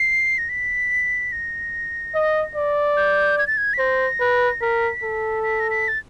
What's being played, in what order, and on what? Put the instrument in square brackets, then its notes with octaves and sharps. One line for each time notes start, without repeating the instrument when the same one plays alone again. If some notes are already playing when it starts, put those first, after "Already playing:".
Already playing: [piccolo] C7
A#6
B6
A#6
[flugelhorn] D#5
D5
[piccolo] G6
G#6
A6
G#6
B6
[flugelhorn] C5 [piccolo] A#6
[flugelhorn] B4
[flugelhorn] A#4 [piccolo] B6
[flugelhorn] A4
[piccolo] B6
A#6
B6
A6